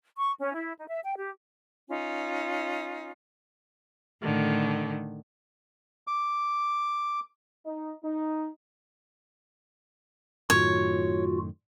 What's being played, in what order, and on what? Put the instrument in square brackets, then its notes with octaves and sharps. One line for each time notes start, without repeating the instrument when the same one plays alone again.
[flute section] C#6
C#4
E4
D#4
E5
G5
G4
C#4 D#4 F4
[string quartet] A2 D3 D#3
[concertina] D6
[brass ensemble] D#4
D#4
[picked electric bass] F#2 A2 D#3 [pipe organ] F4 F#4 [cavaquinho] C#5